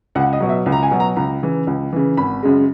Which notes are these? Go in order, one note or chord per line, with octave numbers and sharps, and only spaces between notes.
C#2 F#5
D#5
B2 F#3
E5
C#2
A#5
G#5
B2 F#3
A#5
C#2 A#5
C#3 E3
C#2
C#3 E3
G#1 B5
F#2 C#3 G#3